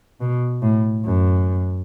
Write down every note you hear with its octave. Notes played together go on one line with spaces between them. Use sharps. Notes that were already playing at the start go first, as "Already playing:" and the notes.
B2
A2
F#2